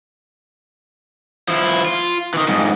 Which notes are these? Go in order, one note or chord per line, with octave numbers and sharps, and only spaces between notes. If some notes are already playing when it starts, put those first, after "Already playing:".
F3 E4
F4
D#3 E3
F2 G#2